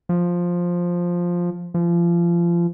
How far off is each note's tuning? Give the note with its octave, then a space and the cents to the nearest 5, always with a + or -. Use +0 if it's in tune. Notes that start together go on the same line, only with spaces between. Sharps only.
F3 +5
F3 -30